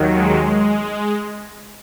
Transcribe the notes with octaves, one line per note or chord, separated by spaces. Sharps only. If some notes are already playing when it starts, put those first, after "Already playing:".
Already playing: D#2 D#3 F#3
G#3